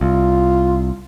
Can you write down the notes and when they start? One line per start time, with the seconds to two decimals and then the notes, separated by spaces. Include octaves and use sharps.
0.01 C2 F4